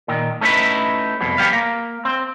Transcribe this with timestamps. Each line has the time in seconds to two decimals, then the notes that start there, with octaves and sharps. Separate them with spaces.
0.08 A#2 D#3
0.41 A3 C#4 D#4 E4 B4
1.21 C2 F2 B2
1.38 B3 G4 F5
1.53 A#3
2.05 C4